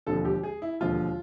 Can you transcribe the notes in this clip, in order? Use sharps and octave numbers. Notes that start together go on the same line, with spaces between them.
E1 D#2 D3 F3 A4
G4
G#4
E4
E1 D#2 D3 F3 F4